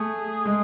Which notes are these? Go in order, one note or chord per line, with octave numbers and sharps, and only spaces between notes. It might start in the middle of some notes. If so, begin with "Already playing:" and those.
Already playing: A3 G#4
G#3